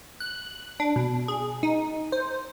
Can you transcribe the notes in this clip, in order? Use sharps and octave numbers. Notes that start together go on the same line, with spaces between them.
F#6
D4
B2
G#4
D#4
C5